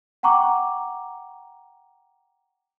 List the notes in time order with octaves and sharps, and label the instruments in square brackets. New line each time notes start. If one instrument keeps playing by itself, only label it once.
[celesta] F#5 G5 A#5 C#6 D6